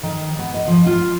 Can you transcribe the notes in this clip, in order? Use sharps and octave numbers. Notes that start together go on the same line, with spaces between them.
D#3
B3
D#5
F3
F4